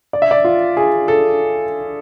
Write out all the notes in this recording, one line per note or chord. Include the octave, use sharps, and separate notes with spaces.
D5
E5
D5
F4
G#4
A4